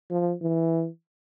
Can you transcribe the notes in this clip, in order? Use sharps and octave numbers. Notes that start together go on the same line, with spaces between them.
F3
E3